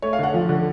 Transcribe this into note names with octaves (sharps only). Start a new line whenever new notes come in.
A3 C#5
F5
D3 F#5
F3
D3